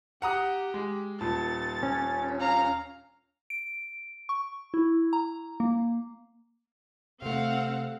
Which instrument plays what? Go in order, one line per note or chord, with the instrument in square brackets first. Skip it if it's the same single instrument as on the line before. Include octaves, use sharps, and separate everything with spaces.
[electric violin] G4 [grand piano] F#5 A#5 D#6
[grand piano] G#3
[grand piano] D#1 A#2 A5 [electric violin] A6
[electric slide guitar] C#4
[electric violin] F5 A#5
[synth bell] D7
C#6
E4
A#5
A#3
[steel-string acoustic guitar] C3 A3 [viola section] C4 F5 F#5